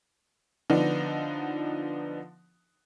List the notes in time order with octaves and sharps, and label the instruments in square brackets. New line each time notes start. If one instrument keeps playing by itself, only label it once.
[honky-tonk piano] D3 F3 B3 D4 D#4